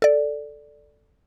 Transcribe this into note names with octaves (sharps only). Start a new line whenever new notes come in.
A4 D5